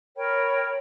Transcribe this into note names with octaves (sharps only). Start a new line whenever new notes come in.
A#4 C#5 G5 B5